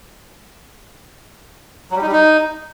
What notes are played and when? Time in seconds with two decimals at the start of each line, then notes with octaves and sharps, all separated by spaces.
1.91 F#3
1.96 G3
2.01 D#4
2.07 G3
2.12 D#4